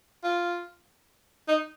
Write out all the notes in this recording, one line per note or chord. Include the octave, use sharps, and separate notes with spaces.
F4
D#4